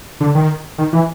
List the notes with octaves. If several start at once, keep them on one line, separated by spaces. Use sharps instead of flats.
D3
D#3
D#3
E3